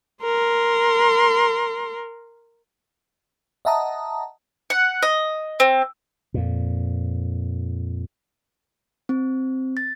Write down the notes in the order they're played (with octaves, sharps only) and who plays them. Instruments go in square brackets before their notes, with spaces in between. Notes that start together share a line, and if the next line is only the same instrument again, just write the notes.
[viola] A#4 C6
[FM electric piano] D#5 E5 F#5 A5 A#5 D#6
[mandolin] F#5
D#5
C4
[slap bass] F2 A#2
[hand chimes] C4
A6